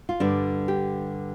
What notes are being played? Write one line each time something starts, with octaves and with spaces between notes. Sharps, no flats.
F4
G2 D3 G3 D4
G4